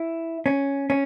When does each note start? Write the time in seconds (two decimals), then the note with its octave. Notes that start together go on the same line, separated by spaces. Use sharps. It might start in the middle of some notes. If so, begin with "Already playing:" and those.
Already playing: E4
0.46 C#4
0.90 C#4